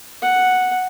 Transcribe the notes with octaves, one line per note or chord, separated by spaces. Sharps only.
F#5